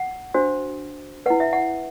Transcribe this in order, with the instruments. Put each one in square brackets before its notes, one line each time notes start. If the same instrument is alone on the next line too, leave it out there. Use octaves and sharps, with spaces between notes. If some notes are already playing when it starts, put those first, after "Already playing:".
Already playing: [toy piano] F#5
D4 F#4 C5
E4 B4 F#5
E5
F#5